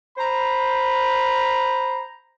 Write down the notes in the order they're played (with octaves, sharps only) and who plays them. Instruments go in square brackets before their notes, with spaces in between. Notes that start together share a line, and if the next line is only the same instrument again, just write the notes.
[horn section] C5 A#5 B5